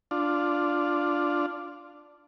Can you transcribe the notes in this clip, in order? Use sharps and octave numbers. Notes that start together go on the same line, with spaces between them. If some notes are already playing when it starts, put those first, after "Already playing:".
D4 F4